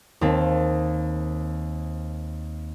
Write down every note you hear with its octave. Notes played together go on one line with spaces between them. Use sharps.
D#2 C4 A5